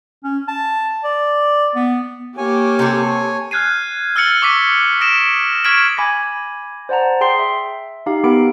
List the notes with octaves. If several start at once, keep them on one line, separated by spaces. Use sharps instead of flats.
C#4
A5
D5
B3
A#3 G4 C#5 G#5
C3 A4
F6 F#6 G#6 C7 D#7
E6 F6 A6 C#7 F#7 G7
C#6 D6 E6 B6 D#7
D#6 A#6 D7 E7
C#6 F6 G#6 B6 D7 F#7
G#5 B5 D6 G#6 A#6
C5 D5 F#5 A5 A#5
G#4 G5 C6 C7
E5
D#4 G4 F5
B3 G4 A#4 B5 D7